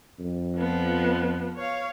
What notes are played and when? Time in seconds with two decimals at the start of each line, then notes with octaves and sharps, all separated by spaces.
0.19 F2
0.56 F3 B3
1.57 C#5 F5